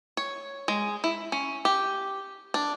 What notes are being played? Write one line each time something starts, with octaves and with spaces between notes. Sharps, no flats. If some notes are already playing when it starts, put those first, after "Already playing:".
C#5
G#3
E4
C#4
G4
D4